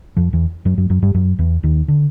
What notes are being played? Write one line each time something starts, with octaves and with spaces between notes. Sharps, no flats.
F2 F3
E2 E3
F#2 F#3
F#2 F#3
F#2 F#3
G2 G3
F#2 F#3
E2 E3
D#2 D#3
D3